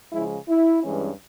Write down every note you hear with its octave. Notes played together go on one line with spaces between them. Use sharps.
C#3 F3 G#3 E4
E4
G2 E3 G#3 C#4